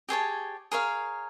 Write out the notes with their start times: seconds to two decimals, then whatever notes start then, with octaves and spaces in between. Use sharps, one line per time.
0.09 G4 G#4 C#5 A5
0.72 G#4 A#4 C#5 F5